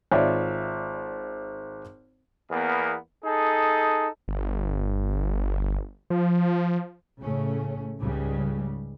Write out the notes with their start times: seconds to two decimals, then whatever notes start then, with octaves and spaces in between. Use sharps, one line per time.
0.12 G#1 F4 C#5 D5 E5
2.50 E2 A#3 B3
3.25 D#4 G#4 A4
4.28 G1
6.10 F3
7.20 A2 C#3 A3 C#4
7.98 C#2 G#2 C#3 G3 G#3